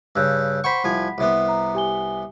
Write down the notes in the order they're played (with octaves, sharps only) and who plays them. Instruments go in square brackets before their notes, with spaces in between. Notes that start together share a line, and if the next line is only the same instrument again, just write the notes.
[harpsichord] G2 C#3 [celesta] E6 F#6 G6
[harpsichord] C5 G5 C#6 [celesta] F#5 B5 B6
[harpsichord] C2 F3 G#5
C2 C3 B3
[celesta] A#5
G4 G#5 G7